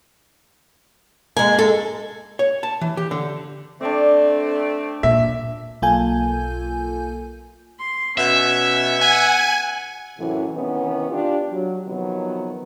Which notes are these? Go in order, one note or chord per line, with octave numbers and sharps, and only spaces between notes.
G#3 A#3 G#5
A4
C#5
A5
E3
G4
D3
A3 C4 D4 D5
A#2 E5
B1 A#3 F4 A4 G#5 G6
C6
B2 C#4 E5
F#5 G#5
F#2 A2 C3 E3
C3 D#3 E3 B3 C#4
D4 F4 G4
F#3
C3 D#3 F3 F#3 B3